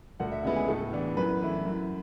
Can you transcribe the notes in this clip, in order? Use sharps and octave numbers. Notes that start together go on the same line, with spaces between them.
D2 F#5
E5
C#3 G#3 B3 E4 E5
G#4
A2 A4
E3 B3 D4
F#2 B4
E3 A3 E4
F#2